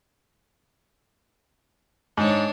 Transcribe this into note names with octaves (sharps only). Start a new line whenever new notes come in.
G#2 D4 C#5